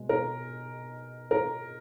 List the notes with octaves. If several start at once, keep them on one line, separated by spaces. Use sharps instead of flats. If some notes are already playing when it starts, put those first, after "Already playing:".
Already playing: B2 G#3
A#4
A#4